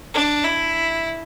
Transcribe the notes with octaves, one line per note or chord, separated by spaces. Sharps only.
D4
E4